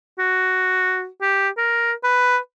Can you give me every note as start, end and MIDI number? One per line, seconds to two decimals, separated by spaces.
0.19 1.07 66
1.21 1.49 67
1.57 1.92 70
2.04 2.38 71